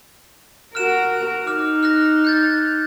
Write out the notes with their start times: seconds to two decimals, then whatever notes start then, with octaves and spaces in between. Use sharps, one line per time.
0.75 F#4 A#4 F6 F#6 E7
1.47 D#4 D6 F6
1.83 F6 F#6 A#6
2.25 F#6 G6 A6